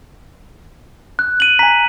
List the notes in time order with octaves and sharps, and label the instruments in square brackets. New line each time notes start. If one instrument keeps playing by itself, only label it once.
[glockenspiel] F#6
D#7 F#7
[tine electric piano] G#5 A#5 [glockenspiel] B6